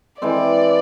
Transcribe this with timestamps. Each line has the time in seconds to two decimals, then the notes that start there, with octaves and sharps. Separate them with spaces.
0.22 E3 G#3 C4 D5